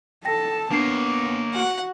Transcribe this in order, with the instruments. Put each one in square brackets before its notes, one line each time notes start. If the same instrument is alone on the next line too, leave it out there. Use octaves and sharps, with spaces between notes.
[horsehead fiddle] A4 A5 [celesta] G5 A#6
[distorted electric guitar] A#3 C#5 [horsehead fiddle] B3 [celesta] D4 C7
[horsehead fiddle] F#4 [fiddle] F#5